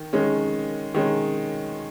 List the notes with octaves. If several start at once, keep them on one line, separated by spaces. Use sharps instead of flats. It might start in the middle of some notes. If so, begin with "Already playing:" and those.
Already playing: D#3
D#3 G#3 C#4
D#3 G#3 C#4